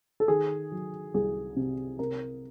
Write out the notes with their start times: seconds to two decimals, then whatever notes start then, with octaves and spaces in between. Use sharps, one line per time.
0.20 A4
0.28 D#3 G#4
0.72 F#3
1.14 C2 G#4
1.56 C3
1.99 C3 A#4